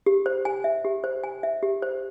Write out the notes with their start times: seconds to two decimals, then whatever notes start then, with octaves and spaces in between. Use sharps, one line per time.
0.06 G4
0.26 C5
0.45 G#5
0.64 E5
0.85 G4
1.04 C5
1.24 G#5
1.43 E5
1.63 G4
1.82 C5